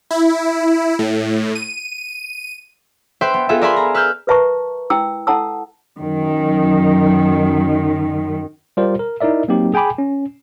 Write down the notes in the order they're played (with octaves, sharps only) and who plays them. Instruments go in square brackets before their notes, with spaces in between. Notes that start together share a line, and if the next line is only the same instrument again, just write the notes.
[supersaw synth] E4
A2
D#7
[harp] B4 C5 E5 G5 C6
B3
B3 F4 G#4 A4 E5
A#4 D5 E5 G#5 B5 C6
A#5
B4 E6 F6 G6
[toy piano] A#4 B4 E5 A5 A#5 C#6
E4 G5 E6
E4 A4 F#5 A5 E6
[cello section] F#2 D#3
[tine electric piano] G3 F4 G4 A#4 C5 D5
A#4
D#4 E4 A#4 D5 E5
F#3 A#3 C4 D#4 G4
G#4 G5 G#5 B5 D6
C#4